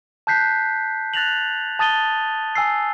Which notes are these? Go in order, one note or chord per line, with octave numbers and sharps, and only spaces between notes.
A5 F#6 G6 B6 C7
F#6 A6 A#6 F7 F#7
A5 D#6 A6 D#7 G7
G#5 E6 C7